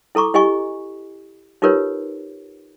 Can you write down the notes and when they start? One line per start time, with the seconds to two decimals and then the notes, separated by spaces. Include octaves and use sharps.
0.15 E4 A4 A#5 C#6 D6
0.34 E4 G4 D#5 G#5 C#6
1.62 D#4 F4 G4 A#4 B4 C#5